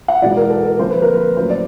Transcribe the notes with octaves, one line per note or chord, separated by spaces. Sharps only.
F#5
E2 B2 G#3 B3 D5
A#4
A4
A#4
F2 D3 F3 A#3 C5
B4
A#4
B4
A2 F#3 A#3 C#4 C5
D5